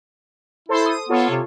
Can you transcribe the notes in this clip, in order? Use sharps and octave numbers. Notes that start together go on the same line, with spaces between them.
E4 A4 C5 C6
D#6
B3 F4 A4 C#5
C3